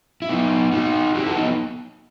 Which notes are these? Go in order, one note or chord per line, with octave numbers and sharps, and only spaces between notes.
E4
B3 D#4
D#4 F#4
E4 G4
F#4 A4
B3 D#4